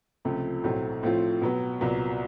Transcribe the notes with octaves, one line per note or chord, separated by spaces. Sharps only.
C#2 C3 F3 A3
B1 A2 F#3 A3 C4
A2 F3 A3 C4 F4
B2 F#3 B3
C2 A#2 F#3 B3